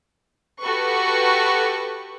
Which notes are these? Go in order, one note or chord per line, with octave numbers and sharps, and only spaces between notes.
F#4 G4 A4 B4 C#6